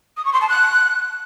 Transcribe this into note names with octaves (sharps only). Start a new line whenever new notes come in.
D#6
C#6
C6
A5
F#6